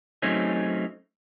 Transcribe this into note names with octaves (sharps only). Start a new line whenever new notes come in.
F#3 A3 C4 C#4 D#4 G#4